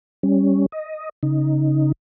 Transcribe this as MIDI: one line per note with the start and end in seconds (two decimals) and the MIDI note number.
0.23 0.66 55
0.23 0.66 61
0.72 1.09 75
1.23 1.92 49
1.23 1.92 63